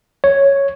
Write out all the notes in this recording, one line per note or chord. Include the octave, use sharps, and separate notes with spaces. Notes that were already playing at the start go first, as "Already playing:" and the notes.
C#5